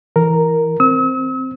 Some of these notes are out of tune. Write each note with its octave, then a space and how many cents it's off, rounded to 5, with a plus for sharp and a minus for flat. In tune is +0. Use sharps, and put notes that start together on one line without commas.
E3 +0 A#4 +0
C4 +0 E6 -45